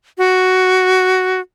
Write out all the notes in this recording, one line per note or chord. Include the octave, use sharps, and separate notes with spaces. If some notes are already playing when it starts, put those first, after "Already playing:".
F#4